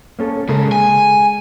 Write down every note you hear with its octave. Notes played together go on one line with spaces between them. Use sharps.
A#3 C#4 A4
C#3 G#3 A4 A#4
G#5